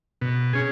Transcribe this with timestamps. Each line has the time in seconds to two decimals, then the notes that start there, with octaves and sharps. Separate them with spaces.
0.21 B2
0.53 C#4 G#4